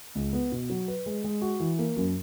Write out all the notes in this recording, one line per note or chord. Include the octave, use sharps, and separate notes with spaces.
C#2
B3
B2
F#3
B4
G#3
G#3
F#4
E3
A#3
F#2